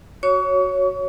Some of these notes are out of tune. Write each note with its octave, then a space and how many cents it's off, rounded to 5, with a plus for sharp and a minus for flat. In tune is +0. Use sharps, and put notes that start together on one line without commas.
F#4 +0 C#5 +0 C#6 +40